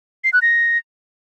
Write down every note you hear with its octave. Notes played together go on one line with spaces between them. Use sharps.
C7
F#6
A#6